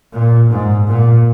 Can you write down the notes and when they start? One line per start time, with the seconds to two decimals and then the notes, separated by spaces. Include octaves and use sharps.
0.13 A#2
0.50 G#2
0.87 A#2